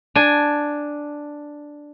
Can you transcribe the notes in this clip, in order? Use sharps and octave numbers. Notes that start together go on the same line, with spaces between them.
D4 G#5